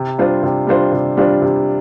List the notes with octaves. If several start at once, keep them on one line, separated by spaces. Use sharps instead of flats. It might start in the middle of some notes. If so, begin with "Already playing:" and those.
Already playing: C3
G3 D4 F4 C5
C3
G3 D4 F4 C5
C3
G3 D4 F4 C5
C3